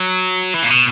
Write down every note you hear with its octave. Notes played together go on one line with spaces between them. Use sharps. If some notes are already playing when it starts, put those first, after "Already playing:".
Already playing: F#3
E3
A#2
B2